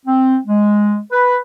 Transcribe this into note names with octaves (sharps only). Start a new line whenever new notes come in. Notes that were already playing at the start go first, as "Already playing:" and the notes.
C4
G#3
B4